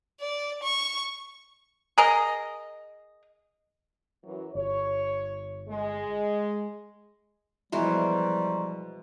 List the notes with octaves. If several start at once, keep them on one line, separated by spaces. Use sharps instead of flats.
D5
C#6
G#4 A#4 D#5
F#2 E3 F#3
G1 C#5
G#3
B2 E3 F3 G3 G#3 A#5 C6 C#6